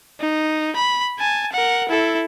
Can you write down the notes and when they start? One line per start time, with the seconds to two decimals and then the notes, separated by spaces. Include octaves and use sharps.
0.20 D#4
0.76 B5
1.19 G#5 A5
1.52 A#4 F#5
1.88 E4 A4